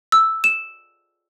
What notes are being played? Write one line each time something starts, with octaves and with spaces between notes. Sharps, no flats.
E6
E7